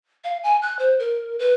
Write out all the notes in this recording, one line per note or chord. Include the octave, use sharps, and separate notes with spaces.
F5
G#5
F#6
C5
A#4
B4